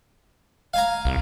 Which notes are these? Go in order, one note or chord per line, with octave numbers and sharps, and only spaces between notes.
F5 G#5 A#5
C2